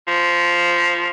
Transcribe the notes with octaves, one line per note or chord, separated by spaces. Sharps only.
F3